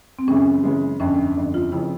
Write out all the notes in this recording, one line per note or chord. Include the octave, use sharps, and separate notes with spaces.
C4
F#2 C#3 E3 G#3 C#4
F#2 C#3 E3 G#3
G1 F2 D3 C#4
G1 F2 D3
F4
F1 F2 C#3 E4